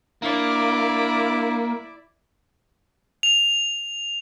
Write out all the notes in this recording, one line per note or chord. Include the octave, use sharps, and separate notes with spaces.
A#3 D4 E4 D5
F7